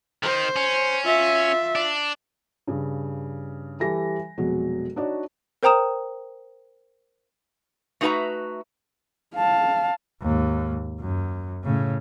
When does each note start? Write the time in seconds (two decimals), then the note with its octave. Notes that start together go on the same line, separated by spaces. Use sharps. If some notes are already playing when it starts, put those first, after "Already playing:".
0.23 D#3 C5
0.56 C#4
1.04 F4 E5
1.75 D4
2.68 G2 C#3
3.80 E3 G3 A4 A#6
4.38 F1 B2 F#3 G#3
4.96 D4 D#4 F#4 C#5 D5
5.63 A#4 C5 G5 A#5 D#6 E7
8.01 A3 D#4 F#4 B4 E5 A#5
9.36 F5 A5
10.22 D#2 G#2
11.00 F#2
11.64 A2 C#3